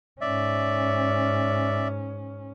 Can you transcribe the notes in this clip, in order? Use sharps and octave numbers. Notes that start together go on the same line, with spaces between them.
G#2 C#4 D5 E5